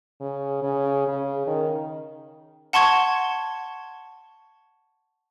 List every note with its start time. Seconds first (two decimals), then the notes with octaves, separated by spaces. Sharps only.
0.21 C#3
0.62 C#3
1.07 C#3
1.47 D#3
2.73 F#5 A5 C6 C#6 G#6